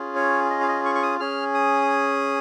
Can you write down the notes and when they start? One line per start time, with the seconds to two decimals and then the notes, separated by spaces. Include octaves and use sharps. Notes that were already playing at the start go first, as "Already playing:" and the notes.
Already playing: C#4 F4 G#4
0.16 C#5
0.50 D#5
0.61 F5
0.68 D#5
0.85 C#6
0.95 C#6
1.03 D#6
1.20 C#4 G#4 F6
1.54 D#6